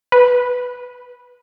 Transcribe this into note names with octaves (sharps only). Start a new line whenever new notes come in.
B4